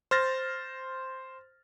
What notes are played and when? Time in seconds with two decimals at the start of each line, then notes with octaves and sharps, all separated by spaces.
0.11 C5 F6 A6 A#6